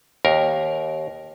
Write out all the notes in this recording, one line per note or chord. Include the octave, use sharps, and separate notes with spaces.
D#2 A#4